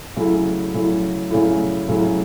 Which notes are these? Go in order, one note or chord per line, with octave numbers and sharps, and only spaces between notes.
C#3 F#3 A3 E4
C#3 F#3 A3 E4
C#3 F#3 A3 E4
C#3 F#3 A3 E4